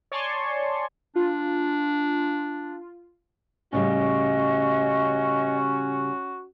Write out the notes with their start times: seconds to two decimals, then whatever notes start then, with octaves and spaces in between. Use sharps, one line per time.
0.12 C#5 D5 G#5 A5 C6 C#6
1.16 D4 F4
3.73 A2 C#3 G3 C#4 F#4 D#5